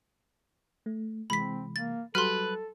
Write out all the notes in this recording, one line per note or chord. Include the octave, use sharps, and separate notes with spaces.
A3
C3 E3 G#3 C4 B5 B6
A#3 A6
F#3 G3 F#4 A4 B4 C6 F6